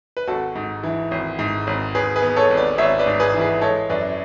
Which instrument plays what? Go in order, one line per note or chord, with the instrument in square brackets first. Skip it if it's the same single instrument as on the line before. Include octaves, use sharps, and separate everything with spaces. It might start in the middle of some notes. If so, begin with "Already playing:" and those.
[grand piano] B4
G#1 F#4 A4
G#2
E3
G#1
G#2
G#1
G#1 G#4 B4
G#4 B4
B3
A4 C#5
G#1
B4 D5
G#1 C#5 E5
B4 D5
G#2
G#4 B4
E3
G#4 B4
G#3 A4 C#5
F#2 B4 D5